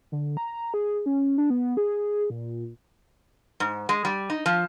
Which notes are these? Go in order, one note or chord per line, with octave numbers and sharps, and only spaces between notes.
D3
A#5
G#4
C#4
D4
B3
G#4
A#2
G#2
G#3
G3
D#4
F3